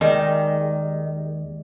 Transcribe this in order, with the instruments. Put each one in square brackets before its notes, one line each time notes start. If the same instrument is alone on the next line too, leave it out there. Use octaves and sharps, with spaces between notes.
[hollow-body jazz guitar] D#2 [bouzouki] D#3 [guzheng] G3 G#3